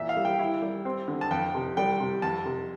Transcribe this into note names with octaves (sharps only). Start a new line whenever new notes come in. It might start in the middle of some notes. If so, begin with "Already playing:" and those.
Already playing: A#2 E3 E5
F5
G3
G5
E4
G3
C4
D3
A5
F2 G5
C3
G3 G5
C3
F2 A5
C3